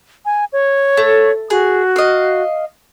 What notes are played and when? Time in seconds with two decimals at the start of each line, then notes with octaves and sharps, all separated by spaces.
0.25 G#5
0.53 C#5
0.97 A3
1.50 F#4 G#4
1.96 D#5 F5